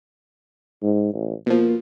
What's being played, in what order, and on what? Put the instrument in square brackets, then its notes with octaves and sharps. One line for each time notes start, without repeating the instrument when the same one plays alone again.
[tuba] G#2
A1
[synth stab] B2 F3 [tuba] A#3